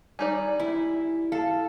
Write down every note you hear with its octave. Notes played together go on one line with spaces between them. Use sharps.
G3 D#4 D5 G#5
E4
A4 F5 A5